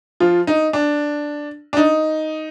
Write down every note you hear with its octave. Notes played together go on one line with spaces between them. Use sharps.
F3 F4
D#4
D4
D4
D#4